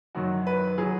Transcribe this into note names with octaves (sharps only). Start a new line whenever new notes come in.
F#2 D#3 F#3 F#4
B4
F#3 G#4